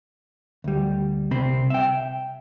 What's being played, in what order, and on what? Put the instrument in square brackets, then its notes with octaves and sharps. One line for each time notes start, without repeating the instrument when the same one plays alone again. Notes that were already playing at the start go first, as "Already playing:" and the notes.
[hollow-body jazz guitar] D2 G3
C2 C3 C4 C5 B5
E5 G5